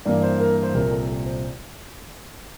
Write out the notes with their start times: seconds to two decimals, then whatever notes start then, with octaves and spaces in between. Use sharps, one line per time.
0.05 G2 E3 A#3 D5
0.23 C5
0.40 A#4
0.63 C5
0.74 C2 A#2 F3 A#4
0.92 A4
1.09 A4
1.26 C5